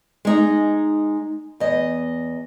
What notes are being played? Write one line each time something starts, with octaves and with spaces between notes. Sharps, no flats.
G#3 D#4
E2 D#5